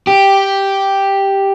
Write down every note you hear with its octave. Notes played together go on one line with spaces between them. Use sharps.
G4